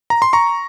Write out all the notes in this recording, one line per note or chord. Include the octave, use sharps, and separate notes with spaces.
A#5
C6
A#5 C#6